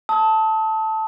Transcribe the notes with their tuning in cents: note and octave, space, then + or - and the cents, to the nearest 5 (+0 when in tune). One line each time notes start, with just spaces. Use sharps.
A5 +0 D#6 +40